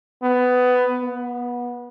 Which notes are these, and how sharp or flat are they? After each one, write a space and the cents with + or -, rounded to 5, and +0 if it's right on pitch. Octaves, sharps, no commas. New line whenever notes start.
B3 +15
B3 -25